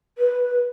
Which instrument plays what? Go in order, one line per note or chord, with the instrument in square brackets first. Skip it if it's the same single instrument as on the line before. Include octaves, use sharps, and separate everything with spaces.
[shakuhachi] B4